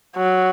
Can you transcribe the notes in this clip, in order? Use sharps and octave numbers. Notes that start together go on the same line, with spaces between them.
F#3